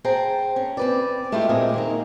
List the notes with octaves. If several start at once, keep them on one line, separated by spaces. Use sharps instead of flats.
G#4 C5 G5 A5 A#5
C#4
C4 B4 D5
G#3 A3 D4 E4 F4 G4
A#2 G#3 A#3 C4 G#4
D#3 A#3 D#4